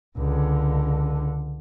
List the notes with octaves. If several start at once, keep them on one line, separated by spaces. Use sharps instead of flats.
C#2 D3